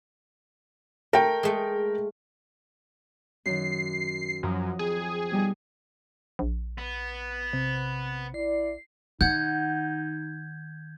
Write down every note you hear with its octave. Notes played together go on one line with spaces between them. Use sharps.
A3 A#4 G5
G#3 A3
F#2 D#3 C7
F#2 F3 A#5 D#6
F2 G#4
B2 G3 D#4
A#1
B3
C3
E4 D5 C7
D#3 D#4 F#5 G6 G#6